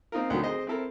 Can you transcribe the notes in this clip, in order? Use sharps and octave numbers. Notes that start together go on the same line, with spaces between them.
A#3 C4 D#4 F4 A#4
D2 D#3 F#3
C4 G#4 C5 D#5
C4 E4 A4 A#4